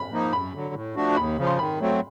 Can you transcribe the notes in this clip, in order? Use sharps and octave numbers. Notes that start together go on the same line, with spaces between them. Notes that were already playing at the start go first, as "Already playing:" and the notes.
Already playing: B5
F3 A#3 D#4
F#2 B5
D3 F#3
A2
F3 A3 D4 F#4
D#2 B5
C#3 F3
C6
D#3 B5
F#3 A3 C4